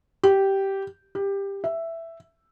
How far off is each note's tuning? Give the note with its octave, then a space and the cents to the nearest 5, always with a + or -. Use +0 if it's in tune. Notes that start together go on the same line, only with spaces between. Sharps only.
G4 -10
G4 +15
E5 +5